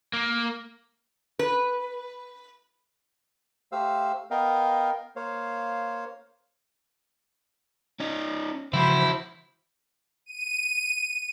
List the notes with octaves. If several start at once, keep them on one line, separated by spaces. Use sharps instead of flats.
A#3
B4
A3 G4 C5 F5 E6
B3 A#4 D#5 F5 G5
A#3 C5 C#5 F5
C#4 D#4
C#3 E3 F3 E4 F#4 C5 B5
D#7